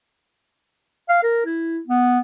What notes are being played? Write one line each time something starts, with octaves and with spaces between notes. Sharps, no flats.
F5
A#4
E4
B3